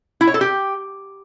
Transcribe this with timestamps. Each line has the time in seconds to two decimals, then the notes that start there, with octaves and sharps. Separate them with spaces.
0.21 E4
0.27 C#5
0.34 A4
0.41 G4